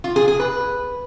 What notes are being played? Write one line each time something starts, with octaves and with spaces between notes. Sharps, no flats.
F4
G#4
G#4
B4